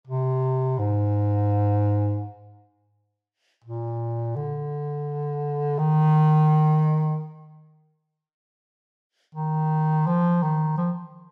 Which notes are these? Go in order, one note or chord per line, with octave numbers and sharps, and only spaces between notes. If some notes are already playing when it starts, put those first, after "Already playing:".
C3
G#2
A#2
D3
D#3
D#3
F3
D#3
F3